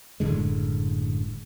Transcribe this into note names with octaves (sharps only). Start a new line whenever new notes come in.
F#1 A2 D3 G#3